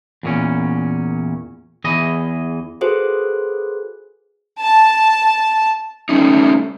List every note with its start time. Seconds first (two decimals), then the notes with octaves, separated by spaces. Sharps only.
0.23 E2 A#2 C#4
1.84 E2 E3 G#4 D#5
2.81 F4 F#4 G#4 A4 B4 C5
4.61 A5
6.09 G3 A3 C#4 D#4